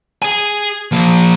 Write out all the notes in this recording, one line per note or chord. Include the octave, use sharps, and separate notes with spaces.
G#4 G#5
F3 A#3